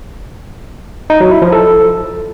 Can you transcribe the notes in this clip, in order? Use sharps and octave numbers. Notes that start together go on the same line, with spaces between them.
D#4
F#3
E4
F3
A4